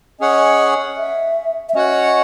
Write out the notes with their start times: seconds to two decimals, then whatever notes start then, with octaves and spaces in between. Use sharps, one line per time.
0.20 C#4 G#4 C#5 D#5 F#5
0.97 E5
1.69 E5
1.75 C#4 F#4 C#5 D#5 F#5